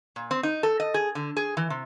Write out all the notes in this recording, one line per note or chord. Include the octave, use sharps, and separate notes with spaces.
A#2
C4
D#4
A4
D#5
G#4
D3
G#4
E3
C3